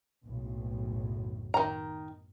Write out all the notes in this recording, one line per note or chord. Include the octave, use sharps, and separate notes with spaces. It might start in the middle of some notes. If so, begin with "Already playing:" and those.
F#1 B1 A2
D#3 A#5